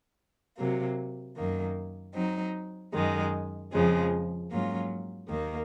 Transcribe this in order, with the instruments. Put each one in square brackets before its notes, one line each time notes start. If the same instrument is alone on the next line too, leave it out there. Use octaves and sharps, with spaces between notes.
[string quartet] C3 F#3 A#3
F#2 D#3 A#3
F#3 C4 D#4
F#2 D#3 G#3
F2 C#3 F3 G#3
G#2 F#3 A#3 C#4 F4
D#2 D#3 A#3